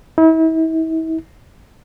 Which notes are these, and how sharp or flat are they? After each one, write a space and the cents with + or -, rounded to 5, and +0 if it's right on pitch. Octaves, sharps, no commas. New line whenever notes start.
E4 -40